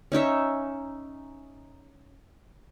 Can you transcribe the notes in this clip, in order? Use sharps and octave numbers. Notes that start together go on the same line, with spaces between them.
C#4 D#4 C#5 E5